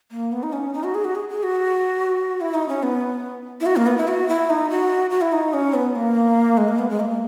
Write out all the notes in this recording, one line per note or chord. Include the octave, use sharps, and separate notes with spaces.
A#3
B3
D#4
C#4
D#4
F#4
G#4
F#4
G#4
G#4
F#4
E4
D#4
C#4
B3
E4
F#4
A#3
B3
E4
F#4
E4
D#4
F#4
F#4
E4
D#4
C#4
B3
A#3
G#3
A#3
B3
G#3
A#3